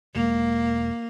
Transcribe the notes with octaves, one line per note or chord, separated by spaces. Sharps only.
E1 G#3 A#3